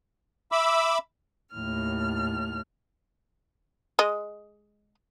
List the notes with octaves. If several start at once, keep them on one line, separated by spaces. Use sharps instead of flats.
E5 B5 D6 E6
D#2 A2 F6
G#3 D#5